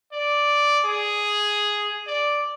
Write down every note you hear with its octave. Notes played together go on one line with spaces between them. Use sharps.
D5
G#4
D5